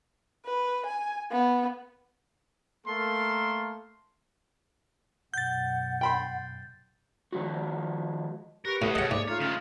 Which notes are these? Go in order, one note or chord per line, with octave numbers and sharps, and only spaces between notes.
B4
G#5
B3
A3 A#3 A4 A#4 F5 C6
F#2 B2 F#5 G6 A6
G5 B5 C6
D#3 F3 G#3 F#4
G4 A#4 B4 C#6
A2 C#4 B4 D#5 F#5
G2 B2 G#4 C#5 D#5 F#5
G#2 A#3 C#5 D5
A3 D#4 F4 A4 C#5
D2 G#3 C#4